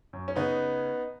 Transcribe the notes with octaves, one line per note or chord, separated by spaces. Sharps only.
F#2
C#4
C#3 B3 D#4